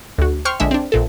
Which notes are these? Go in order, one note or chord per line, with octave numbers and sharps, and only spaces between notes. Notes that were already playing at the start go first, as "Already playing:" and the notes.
D2 F#4
C5 G5 C#6 F6
A#1 D3 G#3 E5
C4 D4
A#1 A#2 A4